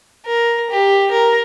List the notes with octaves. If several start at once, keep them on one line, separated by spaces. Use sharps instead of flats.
A#4
G4
A#4